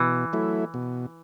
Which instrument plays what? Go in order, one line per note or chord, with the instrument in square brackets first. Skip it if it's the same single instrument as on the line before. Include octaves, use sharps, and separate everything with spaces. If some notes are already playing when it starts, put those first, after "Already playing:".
Already playing: [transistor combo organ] B2 [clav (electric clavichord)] E3
[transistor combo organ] F#3 A3 E4
B2